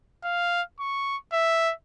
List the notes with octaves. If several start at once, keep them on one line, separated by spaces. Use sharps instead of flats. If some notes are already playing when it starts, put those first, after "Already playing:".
F5
C#6
E5